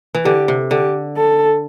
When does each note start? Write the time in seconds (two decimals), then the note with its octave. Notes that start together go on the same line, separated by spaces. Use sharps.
0.15 E3
0.25 D3 G4
0.48 C3
0.71 D3 G4
1.17 A4